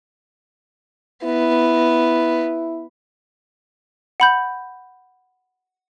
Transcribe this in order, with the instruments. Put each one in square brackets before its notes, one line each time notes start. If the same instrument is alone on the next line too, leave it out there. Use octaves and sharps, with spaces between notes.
[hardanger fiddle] B3 [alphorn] E4
[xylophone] F#5 B5 G6